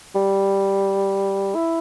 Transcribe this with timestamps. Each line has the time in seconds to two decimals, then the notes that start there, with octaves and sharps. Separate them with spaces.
0.15 G3
1.55 E4